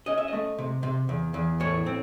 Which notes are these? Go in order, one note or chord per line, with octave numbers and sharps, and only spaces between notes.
C#4 D#5
E5
A3 D#5
C3
C3
E2
E2
A2 C#5
C4